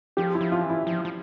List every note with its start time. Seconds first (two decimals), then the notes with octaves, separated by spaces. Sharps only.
0.17 F3 G4
0.35 E4
0.41 F3
0.52 F4
0.63 E3
0.70 E4
0.87 F3
1.05 F3